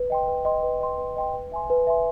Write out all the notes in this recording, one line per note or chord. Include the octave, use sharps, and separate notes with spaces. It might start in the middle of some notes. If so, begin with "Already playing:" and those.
Already playing: B4
D#5 G5 C6
B4
D#5 G5 C6
B4
D#5 G5 C6
B4
D#5 G5 C6
B4
E5 G#5 C6
B4
E5 G#5 C6